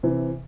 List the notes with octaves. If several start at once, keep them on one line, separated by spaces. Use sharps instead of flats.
C3 E3